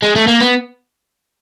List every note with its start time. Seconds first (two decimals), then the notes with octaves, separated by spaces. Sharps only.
0.03 G#3
0.16 A3
0.27 A#3
0.41 B3